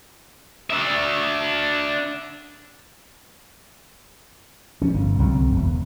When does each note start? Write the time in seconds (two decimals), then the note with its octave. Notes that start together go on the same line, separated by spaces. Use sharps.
0.70 D4 E5
4.82 F3 C#4
4.94 G1
5.19 C2 D3 F#3 C4
5.52 E1